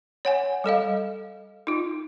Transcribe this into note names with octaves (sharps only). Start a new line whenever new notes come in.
C#5 F#5 G#5
G3 A4 D#5 F5
D#4 F4